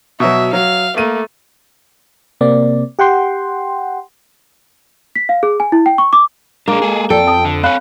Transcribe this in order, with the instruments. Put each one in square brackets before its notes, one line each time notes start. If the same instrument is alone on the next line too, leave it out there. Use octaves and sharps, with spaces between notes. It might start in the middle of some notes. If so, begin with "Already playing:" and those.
[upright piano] B2 F#3 [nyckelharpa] E5
[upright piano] F#3 [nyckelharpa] F5
[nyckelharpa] A3 [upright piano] A#3 D#7
[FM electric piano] C3 A#3 C4 D5
G4 F#5 G5 C6
[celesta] B6
F5
G#4
G#5
E4
G5
C#6
D6
[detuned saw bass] G#3 [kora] A#3 [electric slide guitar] D4 G#4
[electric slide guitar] G#4 A4
[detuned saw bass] F2 [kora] A4 [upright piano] D5 [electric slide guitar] G5
[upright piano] A5 D#6
[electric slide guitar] D3
[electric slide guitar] C4 C#5 [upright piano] F5 B5 F#6